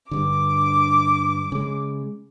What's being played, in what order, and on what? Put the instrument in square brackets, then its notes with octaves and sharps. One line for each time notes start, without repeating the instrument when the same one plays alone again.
[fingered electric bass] G2 D3 [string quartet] D6
[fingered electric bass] C#3 G#3